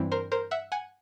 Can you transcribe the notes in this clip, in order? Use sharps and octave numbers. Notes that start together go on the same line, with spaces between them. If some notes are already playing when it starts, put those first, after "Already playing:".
Already playing: G2 E3 G3 C4 E4
A#4 C5
A#4 C5
E5 F#5
F#5 G#5